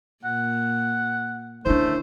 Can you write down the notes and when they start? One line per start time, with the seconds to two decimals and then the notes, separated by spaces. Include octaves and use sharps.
0.24 A#2 F#5
1.66 D3 D#3 A3 C#4 D4 E4 C5